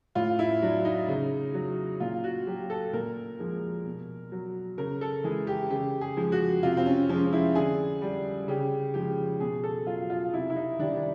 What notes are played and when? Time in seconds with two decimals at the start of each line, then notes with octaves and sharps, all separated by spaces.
0.15 A2 F4
0.39 E4
0.62 F#3 D4
0.85 D#4
1.08 C#3
1.54 F#3
2.00 A#2 F4
2.24 F#4
2.47 F#3 G4
2.70 A4
2.93 A#2 A#4
3.39 F3 G#3
3.85 B2
4.32 F#3
4.78 C#3 A#4
5.01 A4
5.24 E3 G#3 G#4
5.47 G4
5.70 C#3 G4
6.01 G#4
6.17 F3 G#3
6.32 F#4
6.63 C3 F4
6.77 C4
6.86 C#4
7.09 F3 G#3 C#4
7.33 E4
7.55 D3 G#4
8.02 G3
8.48 C#3 G4
8.94 F3 G#3 G4
9.40 B2 G#4
9.63 A4
9.86 F#3 F4
10.10 F4
10.33 C3 E4
10.50 E4
10.56 D#4
10.79 D#3 G3 D4
10.96 D4